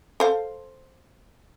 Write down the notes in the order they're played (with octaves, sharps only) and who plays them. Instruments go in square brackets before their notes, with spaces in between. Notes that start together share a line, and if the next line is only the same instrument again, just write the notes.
[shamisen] A4 C5 F5